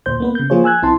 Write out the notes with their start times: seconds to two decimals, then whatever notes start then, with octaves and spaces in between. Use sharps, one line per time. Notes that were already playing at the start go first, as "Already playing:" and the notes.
0.06 D2 A#2 C5 G6
0.20 A#3 B3 B4
0.35 C#3 G6
0.50 F3 A#3 F4 G#4 C5 C#5
0.64 G#5 E6 F#6 G#6
0.82 B1 C4 E4 A5 C6